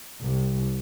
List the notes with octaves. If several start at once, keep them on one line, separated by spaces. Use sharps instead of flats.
C2